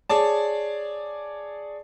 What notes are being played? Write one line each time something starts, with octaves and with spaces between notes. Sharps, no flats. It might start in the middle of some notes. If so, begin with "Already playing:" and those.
G#4 C#5 D5 A5